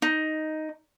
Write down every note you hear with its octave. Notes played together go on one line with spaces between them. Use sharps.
D#4